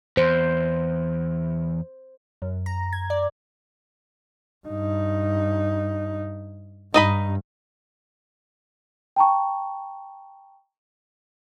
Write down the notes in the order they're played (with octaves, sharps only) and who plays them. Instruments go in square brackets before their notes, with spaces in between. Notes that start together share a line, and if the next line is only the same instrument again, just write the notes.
[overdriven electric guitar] E2 [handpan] C5
[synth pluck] F#2
A#5
G#6
D5
[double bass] G2 D#4
[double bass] G2 [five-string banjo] D#4 D#5 B5
[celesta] G5 A5 A#5 C#6